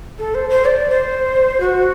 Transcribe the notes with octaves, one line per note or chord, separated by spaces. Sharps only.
A4
C5
C5
D5
C5
F#4